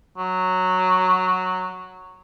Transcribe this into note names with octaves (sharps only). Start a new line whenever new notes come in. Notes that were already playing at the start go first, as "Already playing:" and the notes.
F#3